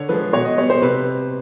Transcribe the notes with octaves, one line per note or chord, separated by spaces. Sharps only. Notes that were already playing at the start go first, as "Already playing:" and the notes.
Already playing: D3 C#5
F3 G#3 B4
B2 C#5
D#5
G3 B3 C#5
C5
C3 B4